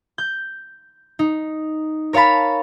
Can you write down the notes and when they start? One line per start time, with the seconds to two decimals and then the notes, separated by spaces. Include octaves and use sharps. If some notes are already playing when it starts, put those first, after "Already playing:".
0.18 G6
1.19 D#4
2.13 A#4 C#5 F5 A5 B5